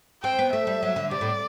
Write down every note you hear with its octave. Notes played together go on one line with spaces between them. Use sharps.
C4 G5
B3
A3 E5
G3
F#3
D3
C3 D5
A2